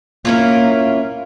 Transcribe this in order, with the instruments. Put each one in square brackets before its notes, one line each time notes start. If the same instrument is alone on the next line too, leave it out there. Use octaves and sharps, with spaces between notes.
[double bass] A#3 [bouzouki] C#4 E4 F4